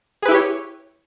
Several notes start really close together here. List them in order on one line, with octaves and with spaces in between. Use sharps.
G#4 B4 E4 G4 C#5